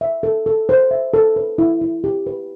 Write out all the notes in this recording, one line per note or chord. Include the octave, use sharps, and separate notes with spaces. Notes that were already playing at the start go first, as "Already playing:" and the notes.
E5
A4
A4
C5
E5
A4
B4
E4
E4
G4
B4